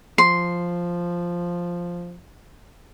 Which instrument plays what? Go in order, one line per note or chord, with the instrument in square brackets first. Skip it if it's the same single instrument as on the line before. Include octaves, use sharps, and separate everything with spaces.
[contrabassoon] F3 [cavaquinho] C6